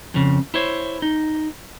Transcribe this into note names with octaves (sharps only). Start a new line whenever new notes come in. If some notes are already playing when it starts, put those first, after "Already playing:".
F2 C#3
E4 C5 C#5
D#4